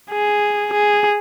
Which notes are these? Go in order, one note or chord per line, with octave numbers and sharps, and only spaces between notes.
G#4
G#4